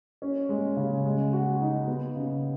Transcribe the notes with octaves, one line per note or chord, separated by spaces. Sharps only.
C#4
G#3
C#3
G#3
F#4
D#4
B3
C#3